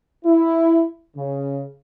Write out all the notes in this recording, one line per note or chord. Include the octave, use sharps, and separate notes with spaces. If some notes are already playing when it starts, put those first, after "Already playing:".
E4
C#3